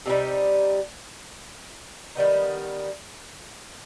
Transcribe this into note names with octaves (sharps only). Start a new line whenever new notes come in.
C3 D#3 G3 D#4
D#3 G3 B3 D#4